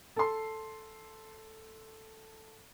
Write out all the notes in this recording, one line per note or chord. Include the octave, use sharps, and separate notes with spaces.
A4 C6